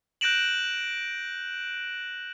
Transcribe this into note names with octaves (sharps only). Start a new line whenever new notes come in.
F#6 G6 A#6 D7 E7 F#7